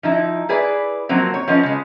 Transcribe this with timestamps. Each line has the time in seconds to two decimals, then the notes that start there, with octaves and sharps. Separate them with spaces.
0.03 F3 D#4 E4
0.49 E4 G#4 B4 D5
1.09 F3 F#3 A#3 C4
1.34 C#5
1.48 F3 B3 C#4 D#5
1.63 C#3 G#3